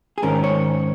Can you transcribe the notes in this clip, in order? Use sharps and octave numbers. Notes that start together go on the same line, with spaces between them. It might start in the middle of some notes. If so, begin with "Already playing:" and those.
G#4
G#2 D#3 C#4 A#4
C#5